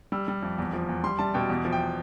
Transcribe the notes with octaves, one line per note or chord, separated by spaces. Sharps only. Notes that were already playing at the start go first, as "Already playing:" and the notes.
G3 E6
G3
F2
E2
F3
E2
G3 C6
G3 A5
B2 G5
E2
F3
G5